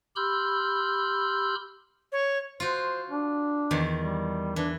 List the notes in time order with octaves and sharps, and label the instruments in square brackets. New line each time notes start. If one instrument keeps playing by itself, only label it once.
[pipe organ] G4 B5 C6 E6 F6 G6
[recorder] C#5
[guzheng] F4 F#4 [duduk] C5
[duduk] D4
[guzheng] E2 D#3
[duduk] G3
[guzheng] E3 [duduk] D4